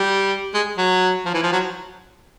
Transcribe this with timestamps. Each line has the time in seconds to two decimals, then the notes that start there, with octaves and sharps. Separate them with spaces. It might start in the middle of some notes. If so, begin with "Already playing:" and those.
Already playing: G3
0.54 G#3
0.78 F#3
1.26 F3
1.34 E3
1.43 F3
1.53 F#3